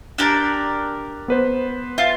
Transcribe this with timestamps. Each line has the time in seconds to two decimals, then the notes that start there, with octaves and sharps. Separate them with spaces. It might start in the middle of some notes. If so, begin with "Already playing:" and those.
0.18 D4 G4 A#4 F#6 A6
1.28 B3 B4 C5
1.98 F4 E5 A6 C7